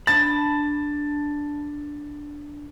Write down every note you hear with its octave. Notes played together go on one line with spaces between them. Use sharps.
D4 A5 B5 A6